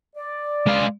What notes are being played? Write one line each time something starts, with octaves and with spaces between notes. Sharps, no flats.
D5
G#3 F5